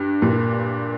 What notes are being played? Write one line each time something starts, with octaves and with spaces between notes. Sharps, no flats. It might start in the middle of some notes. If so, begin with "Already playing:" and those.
Already playing: G2
G2 A#2